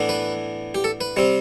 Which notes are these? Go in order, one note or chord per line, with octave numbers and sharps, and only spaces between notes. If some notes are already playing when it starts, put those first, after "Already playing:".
Already playing: A2 E3 B3 D4
B4
G4
A4
B4
C3 G3 C4